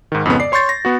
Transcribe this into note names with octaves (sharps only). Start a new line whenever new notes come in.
G#2 D#3
F2 G#2 C#3 B3
D5 C7
C#5 C6 C#6 G6 A6
A#6
B3 F#4